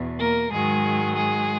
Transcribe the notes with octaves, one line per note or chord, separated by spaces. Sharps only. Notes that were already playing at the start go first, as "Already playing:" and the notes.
Already playing: E2 B2
A#3 A#4
G#2 D#3 F#3 G#3 G#4
G#3 G#4